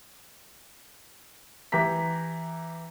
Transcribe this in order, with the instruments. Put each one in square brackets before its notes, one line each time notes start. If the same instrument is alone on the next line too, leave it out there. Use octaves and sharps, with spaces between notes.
[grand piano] E3 G4 A#5 B6